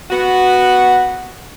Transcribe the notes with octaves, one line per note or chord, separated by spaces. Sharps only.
B3 F#4